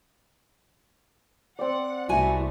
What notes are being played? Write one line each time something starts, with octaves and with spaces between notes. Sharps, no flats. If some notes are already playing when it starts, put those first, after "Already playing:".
C4 D5 F#5
C2 B2 A3 E4 F#4 G#5